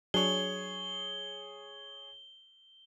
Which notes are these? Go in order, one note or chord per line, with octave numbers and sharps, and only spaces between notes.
F#3 D4 G#4 C#5 G7